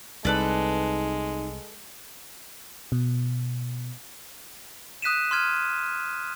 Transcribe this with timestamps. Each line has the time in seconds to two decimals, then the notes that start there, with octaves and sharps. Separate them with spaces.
0.25 C2 G#3 D#4 A4 B4 D5
2.92 B2
5.02 D#6 F#6 B6 D#7 E7
5.31 C6 F6 G#6 D#7